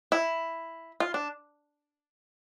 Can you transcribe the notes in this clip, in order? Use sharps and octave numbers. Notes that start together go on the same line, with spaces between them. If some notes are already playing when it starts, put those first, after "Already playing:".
E4
F4
D4